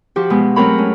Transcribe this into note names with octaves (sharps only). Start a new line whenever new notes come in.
F3 F#4 G4
B2 G#3
F#3 A3 C4 A#4 C#5 B5
C#4